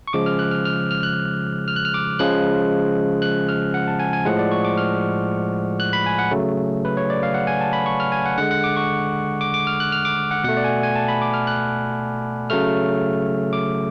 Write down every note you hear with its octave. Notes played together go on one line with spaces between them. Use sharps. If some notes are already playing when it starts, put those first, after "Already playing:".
C#6
C#3 F3 G#3 D6
F6
F#6
F6
F6
F6
F#6
F6
F#6
F6
D6
C#3 F3 G#3 F#6
F#6
F6
F#5
A5
G#5
G#5
A2 F3 G#3 F#5
D5
C#6
D6
F6
F#6
B5
G#5
F#5
C#3 F#3 A3
B4
C#5
D5
F5
F#5
G#5
A5
B5
C#6
F6
G#5
F#5
D3 G#3 F#5
F#5
D6
C#6
D6
D6
F6
F#6
F6
D6
F#5
B2 A3 F#5
D5
G#5
F#5
G#5
A5
B5
D6
F6
F#6
C#3 F#3 A3 F6
D6